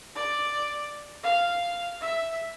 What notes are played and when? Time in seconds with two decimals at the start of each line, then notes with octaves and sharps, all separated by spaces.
0.16 D5
1.23 F5
2.01 E5